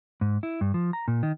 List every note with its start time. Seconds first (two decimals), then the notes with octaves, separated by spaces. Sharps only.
0.21 G#2
0.43 E4
0.61 G2
0.74 F3
0.93 A#5
1.08 A#2
1.23 D#3